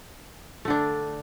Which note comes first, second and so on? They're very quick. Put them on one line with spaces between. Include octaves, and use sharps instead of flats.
A3 D3 D4